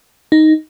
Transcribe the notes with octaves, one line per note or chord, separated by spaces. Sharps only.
D#4